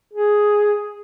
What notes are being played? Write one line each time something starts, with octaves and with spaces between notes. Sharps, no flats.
G#4